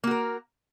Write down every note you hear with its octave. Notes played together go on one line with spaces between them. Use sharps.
A#3 F#4 A#4